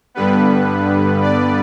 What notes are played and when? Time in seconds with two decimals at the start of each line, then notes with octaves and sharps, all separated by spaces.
0.14 G2 D3 G3 B3 B4
1.22 D5